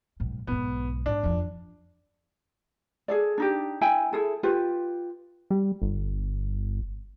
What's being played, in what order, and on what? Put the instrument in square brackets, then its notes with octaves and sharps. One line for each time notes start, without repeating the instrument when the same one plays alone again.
[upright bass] B1 G#2
[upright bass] B1 G#2 [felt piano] B3
[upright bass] G#2 [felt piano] D4
[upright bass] F2 F3
[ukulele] G#4 A4 D5
D4 D#4 G4
E4 G5 G#5
E4 G#4 A4
F4 G4 B4
[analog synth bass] G3
G1